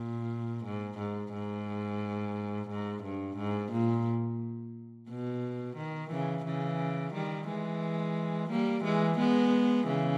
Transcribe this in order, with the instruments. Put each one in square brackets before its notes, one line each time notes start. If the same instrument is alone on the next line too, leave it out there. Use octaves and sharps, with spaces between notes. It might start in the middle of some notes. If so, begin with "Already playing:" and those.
Already playing: [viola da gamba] A#2
G#2
G#2
G#2
G#2
G2
G#2
A#2
B2
D#3
C#3 E3
C#3 E3
D#3 G3
E3 G#3
G3 A#3
E3 G#3
G#3 B3
C#3 E3